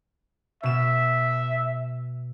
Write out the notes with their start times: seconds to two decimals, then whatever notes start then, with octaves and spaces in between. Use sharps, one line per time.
0.63 B2 E5 E7